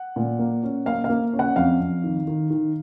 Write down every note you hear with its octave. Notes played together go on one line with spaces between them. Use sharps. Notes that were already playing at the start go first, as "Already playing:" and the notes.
Already playing: F#5
A#2
A#3
C#4
A#3 F5
F5
A#3
C#4
F#5
F2 F5
F2
D#3
D#3
D#3